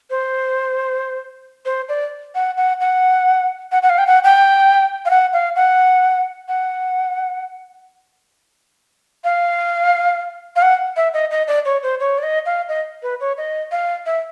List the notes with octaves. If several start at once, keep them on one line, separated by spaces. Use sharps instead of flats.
C5
C5
D5
F#5
F#5
F#5
F#5
F#5
F5
G5
F#5
G5
F5
F#5
F5
F#5
F#5
F5
F5
F#5
E5
D#5
D#5
D5
C#5
C5
C#5
D5
D#5
F5
D#5
B4
C#5
D#5
F5
E5